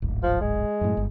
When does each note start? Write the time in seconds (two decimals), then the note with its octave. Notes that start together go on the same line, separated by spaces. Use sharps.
0.02 D1 G#1
0.23 F3
0.41 G#3
0.81 F#2 A2
0.97 G1